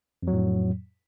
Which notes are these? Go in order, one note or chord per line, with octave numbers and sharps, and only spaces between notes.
F2 A2 F#3